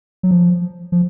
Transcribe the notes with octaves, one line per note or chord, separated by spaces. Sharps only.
F#3
F3
F3